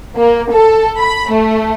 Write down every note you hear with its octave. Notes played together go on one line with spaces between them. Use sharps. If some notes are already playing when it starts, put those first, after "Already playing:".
A#3
A4
B5
A3